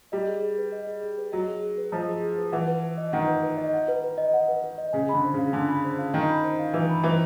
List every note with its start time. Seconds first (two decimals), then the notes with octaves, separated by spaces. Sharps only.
0.12 G3 D#5
0.27 G#4
0.43 G#4
0.58 B4
0.72 D#5
0.87 G#4
1.03 G#4
1.18 B4
1.32 F#3 D#5
1.47 G#4
1.62 G#4
1.78 B4
1.92 F3 D#5
2.08 G#4
2.23 G#4
2.38 B4
2.52 E3 F#5
2.67 B4
2.83 B4
2.98 D#5
3.13 D#3 F#5
3.27 B4
3.43 B4
3.58 D#5
3.74 F#5
3.88 B4
4.04 B4
4.18 D#5
4.34 F#5
4.48 B4
4.64 B4
4.78 D#5
4.93 C#3 G#5
5.09 D3 B5
5.24 C5
5.34 C#3
5.38 F5
5.53 D3 G#5
5.68 B5
5.84 C5
5.98 F5
6.13 D#3 G#5
6.29 B5
6.43 C5
6.59 F5
6.73 E3 G#5
6.89 B5
7.03 E3 C5